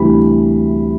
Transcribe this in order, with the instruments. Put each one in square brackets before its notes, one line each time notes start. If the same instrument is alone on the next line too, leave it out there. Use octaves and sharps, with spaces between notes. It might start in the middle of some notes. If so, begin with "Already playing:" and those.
Already playing: [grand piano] D2 C3 E3 G3 B5